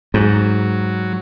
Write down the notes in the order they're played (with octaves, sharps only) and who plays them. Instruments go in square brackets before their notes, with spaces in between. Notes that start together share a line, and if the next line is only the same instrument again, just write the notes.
[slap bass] G#2 [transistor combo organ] F#3